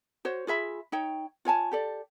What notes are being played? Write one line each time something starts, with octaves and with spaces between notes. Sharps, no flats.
F#4 C5 C#5
F4 G#4 E5 B5
D#4 C#5 G5
F4 C#5 G#5 A5
G4 A4 D5